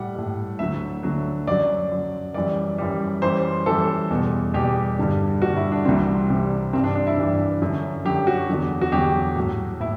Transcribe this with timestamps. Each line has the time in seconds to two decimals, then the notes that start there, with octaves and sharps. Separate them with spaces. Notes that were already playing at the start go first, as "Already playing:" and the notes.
Already playing: A2 G3 F#5
0.15 A2 G3
0.59 D2 D3 F#3 E5
1.03 D2 D3 F#3
1.47 F#2 F#3 D5
1.92 F#2 F#3
2.34 F#2 E3 G3 D5
2.78 F#2 E3 G3
3.22 F#2 E3 G3 C5
3.66 F#2 E3 G3 A4
4.10 E2 B2 G3
4.54 E2 B2 G3 G4
4.98 G2 D3 G3
5.42 G2 D3 G3 F#4
5.57 E4
5.72 D4
5.85 C2 C3 E3 G3 C4
6.30 C2 C3 E3 G3
6.73 G2 E3 G3 C4
6.84 D4
6.95 D4
7.07 E4
7.17 G2 E3 G3
7.61 F#2 D3 F#3
8.05 F#2 D3 F#3 G4
8.27 F#4
8.49 E2 D3 F#3
8.81 F#4
8.92 E2 D3 F#3 G4
9.36 A2 F#3
9.80 A2 E4